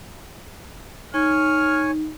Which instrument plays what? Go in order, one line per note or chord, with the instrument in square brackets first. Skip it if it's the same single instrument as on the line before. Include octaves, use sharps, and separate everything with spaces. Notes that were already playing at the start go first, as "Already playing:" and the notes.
[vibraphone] D#4 [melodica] C#5 G#5 [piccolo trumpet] F6